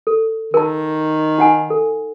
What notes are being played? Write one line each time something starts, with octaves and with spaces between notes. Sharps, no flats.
A4
D#3 A#4 A5
D#4 F#5 G#5
A4